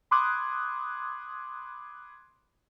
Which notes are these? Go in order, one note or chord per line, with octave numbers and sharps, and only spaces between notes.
B5 C6 D6 D#6 F#6 G#6